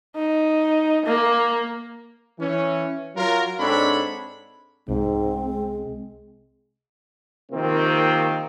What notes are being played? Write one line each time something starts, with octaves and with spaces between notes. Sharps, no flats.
D#4
A#3
E3 C#4
F#3 F4 A#4
G#2 C4 D4 A4 C#5 B5
C2 G#2 C4
G#3
C3 D#3 F3 A#3 C4